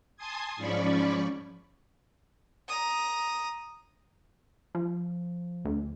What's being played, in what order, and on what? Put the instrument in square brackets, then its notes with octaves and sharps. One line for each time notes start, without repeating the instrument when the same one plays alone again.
[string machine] G#5 A5 C6 D#6 G#6
G#2 F3 C#4 D5 B5 C#6
[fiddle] A#5 D#6
[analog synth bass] F3
D2